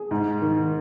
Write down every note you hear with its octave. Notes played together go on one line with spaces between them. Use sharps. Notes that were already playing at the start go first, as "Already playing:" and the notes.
Already playing: G#4
G#2
D#3